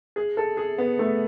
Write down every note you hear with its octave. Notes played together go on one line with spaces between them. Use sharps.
G#4
A4
G#4
B3
A3